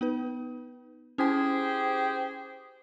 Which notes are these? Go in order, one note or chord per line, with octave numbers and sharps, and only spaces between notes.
B3 D#4 B4
C#4 E4 G4 G#4 C5 G#5